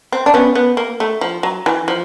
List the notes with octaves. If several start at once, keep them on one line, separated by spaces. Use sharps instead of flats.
C4
D4
B3 C#4
B3
A#3
A3
F3
F#3
E3
F3